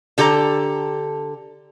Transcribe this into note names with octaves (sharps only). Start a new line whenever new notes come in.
D3 G4 A4 A#5